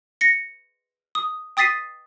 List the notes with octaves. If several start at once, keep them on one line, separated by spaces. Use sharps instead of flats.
A#6 C#7
D#6
G5 D#6 A6 B6 C7 D#7